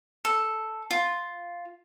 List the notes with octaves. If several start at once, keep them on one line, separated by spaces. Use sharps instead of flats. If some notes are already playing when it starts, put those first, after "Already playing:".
A4
F4